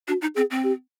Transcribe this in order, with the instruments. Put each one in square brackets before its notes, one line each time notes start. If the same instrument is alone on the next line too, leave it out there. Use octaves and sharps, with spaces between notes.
[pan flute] D4 [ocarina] F#4
[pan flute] D#4
[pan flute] C4 [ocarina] G#4
[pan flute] C4
[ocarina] G4